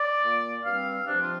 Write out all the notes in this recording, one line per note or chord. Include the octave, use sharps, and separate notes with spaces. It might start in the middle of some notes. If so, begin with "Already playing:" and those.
Already playing: D5
A#2 A#3
G2 G3 C4 F5
C3 F3 C4 D4
F4